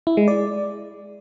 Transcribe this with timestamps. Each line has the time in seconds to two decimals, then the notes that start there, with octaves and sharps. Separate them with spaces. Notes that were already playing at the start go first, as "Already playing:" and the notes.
0.07 E4
0.17 G#3
0.28 D5